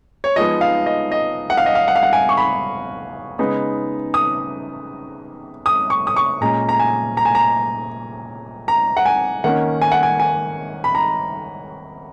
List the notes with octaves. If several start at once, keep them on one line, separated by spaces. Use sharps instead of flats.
C#5
F3 G#3 B3 D#4 D#5
F5
D#5
D#5
F#5
F5
D#5
F5
F#5
F5
F#5
G#5
C#6
B5
C#3 G#3 B3 D#4
D#6
D#6
C#6
D#6
C#6
A#2 G#3 C#4 A#5
A#5
G#5
A#5
G#5
A#5
A#5
F#5
G#5
D#3 A#3 C#4 F#5
G#5
F#5
G#5
G#5
B5
A#5